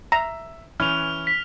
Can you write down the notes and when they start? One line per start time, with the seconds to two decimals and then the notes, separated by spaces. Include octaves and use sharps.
0.12 E5 A#5
0.80 E3 C#4 B4 F6 F7
1.27 B6